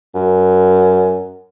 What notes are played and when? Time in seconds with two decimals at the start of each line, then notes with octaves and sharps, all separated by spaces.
0.15 F#2